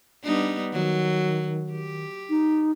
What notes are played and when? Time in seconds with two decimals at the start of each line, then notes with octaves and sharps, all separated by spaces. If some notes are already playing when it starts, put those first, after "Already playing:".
0.24 G3 B3 D4 D#4
0.73 D#3 F#3
1.71 G4
2.30 D#4